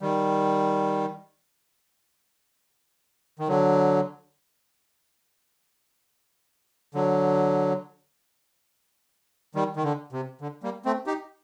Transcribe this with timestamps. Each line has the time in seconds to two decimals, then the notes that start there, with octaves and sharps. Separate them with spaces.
0.01 D#3 G3
3.39 D#3
3.48 D3 F#3
6.95 D3 F#3
9.55 D#3 G3
9.77 D#3
9.84 D3
10.12 C3
10.41 D3
10.63 G3 A#3
10.85 A3 C4
11.07 D#4 G4